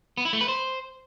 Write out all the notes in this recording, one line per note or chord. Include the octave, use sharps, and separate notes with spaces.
B3
E4
A3
B4
C5